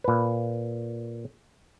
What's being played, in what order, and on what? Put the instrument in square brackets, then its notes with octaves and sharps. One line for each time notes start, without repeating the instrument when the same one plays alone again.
[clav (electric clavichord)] A#2 B4